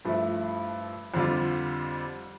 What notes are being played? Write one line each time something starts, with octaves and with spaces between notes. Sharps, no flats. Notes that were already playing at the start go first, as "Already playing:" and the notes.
G2 F3 A3 E4
F2 D3 G3 D4 F4